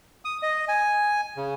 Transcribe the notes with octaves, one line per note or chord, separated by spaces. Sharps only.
D#6
D#5
G#5
C#3